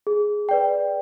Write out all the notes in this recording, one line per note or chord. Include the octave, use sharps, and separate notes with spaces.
G#4
B4 D5 G5